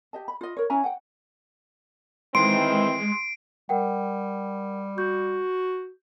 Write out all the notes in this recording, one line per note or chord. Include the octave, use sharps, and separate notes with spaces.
G4 D#5 A5
B5
F4 D#5
A#4 C#5
C#4 E4 G#5 A#5
F#5 G5
D#3 E3 G#3 C4 C6 C7 D7
G3 A#4 F#5 G5
F#4 G6